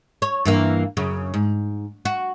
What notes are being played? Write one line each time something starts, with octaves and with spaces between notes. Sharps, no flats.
C#5
G2 E3 A#3
F#2 C#3
G#2
F#4